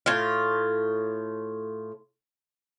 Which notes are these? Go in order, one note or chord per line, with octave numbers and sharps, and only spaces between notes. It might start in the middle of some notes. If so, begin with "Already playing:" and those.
A2 F4